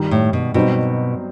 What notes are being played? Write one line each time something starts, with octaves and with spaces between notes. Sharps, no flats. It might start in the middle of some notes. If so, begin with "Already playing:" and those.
Already playing: G2 D#3 G3
A2
B2
G2 B2 F#3 C4 D#4